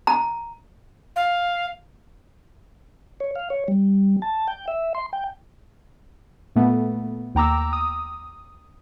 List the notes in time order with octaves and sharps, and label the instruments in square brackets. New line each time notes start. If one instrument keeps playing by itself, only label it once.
[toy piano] A#5
[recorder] F5
[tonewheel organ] C#5
F5
C#5
G3
A5
G5
E5
C6
G5
[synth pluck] A#2 A3 B3
D#2 G5 A#5 D6 E6
D#6